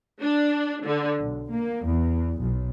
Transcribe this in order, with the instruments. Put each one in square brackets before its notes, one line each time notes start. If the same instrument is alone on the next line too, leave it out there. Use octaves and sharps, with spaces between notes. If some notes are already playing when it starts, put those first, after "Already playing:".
[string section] D4
D3
B1
A#3
E2
B1